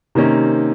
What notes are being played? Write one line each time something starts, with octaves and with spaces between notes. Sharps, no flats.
C3 D#3 A#3 C#4